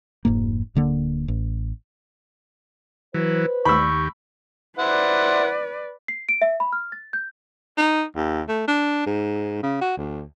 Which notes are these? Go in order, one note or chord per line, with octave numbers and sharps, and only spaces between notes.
F1 G#2 A#3
D1 D3 A#3
A1
E3 F#3 B4 C5
D#2 G4 B5 C#6 E6
E4 B4 C5 D5 F#5
C7
D7
E5
B5
F6
A6
G6
D#4
D#2
A3
D4
G#2
C#3
F#4
D2